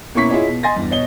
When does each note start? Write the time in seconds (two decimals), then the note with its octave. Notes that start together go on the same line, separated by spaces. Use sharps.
0.14 B2 A#3 C#4 E4 C#6 B6
0.30 E4 F4 G#4 C#5 D#5
0.48 B2
0.63 D#5 G#5 C6 A6 A#6
0.76 E2 G2
0.91 B2 C#5 D#5 G7